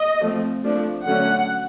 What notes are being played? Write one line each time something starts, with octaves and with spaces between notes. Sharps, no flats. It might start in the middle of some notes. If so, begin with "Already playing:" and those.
Already playing: D#5
F3 A3 C4
F3 A3 D4
D3 F#3 A3 C#4 F#5